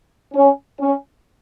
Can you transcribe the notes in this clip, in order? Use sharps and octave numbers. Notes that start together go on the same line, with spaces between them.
C#4
C#4